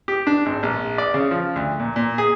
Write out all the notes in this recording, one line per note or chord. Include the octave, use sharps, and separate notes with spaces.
G4
D4
G#1
A#1
D5
C#3
F3
D2
A#2
A#2
G#4